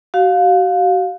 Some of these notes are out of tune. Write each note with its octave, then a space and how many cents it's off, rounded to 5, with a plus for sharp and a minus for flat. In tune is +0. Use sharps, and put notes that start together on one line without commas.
F#4 +40 F5 +20